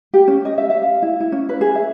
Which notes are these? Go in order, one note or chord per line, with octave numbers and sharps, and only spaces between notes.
G4
C#4
D#5
E5
E5
F5
E4
E4
C#4
B4
G#4
E5